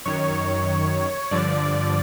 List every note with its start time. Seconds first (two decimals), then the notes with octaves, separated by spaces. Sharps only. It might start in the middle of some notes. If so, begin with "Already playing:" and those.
0.06 F#2 D#3 C#5
1.31 G2 D3 F3 D5